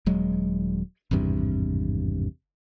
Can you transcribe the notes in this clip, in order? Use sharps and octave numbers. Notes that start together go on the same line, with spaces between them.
D#1 F#3 G#3
G#1 E2 G2 C3